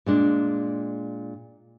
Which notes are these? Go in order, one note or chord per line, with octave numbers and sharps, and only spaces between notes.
A#2 G#3 D4